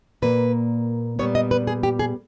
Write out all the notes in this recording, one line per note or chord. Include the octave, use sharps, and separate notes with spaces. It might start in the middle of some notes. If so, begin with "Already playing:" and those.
A#2 A#3 B4
A#2 G3 B3 C#5
D#5
B4
G#4
G4
G#4